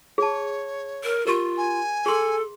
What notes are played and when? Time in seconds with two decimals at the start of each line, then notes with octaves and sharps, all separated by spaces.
0.18 G#4 C#5 A5
1.04 A#4
1.27 F4 G4 A#4
1.57 G#5
2.06 G#4 A4 C6